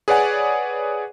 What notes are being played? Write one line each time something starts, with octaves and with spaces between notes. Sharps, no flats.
G#4 B4 C#5 D5 F#5 G#5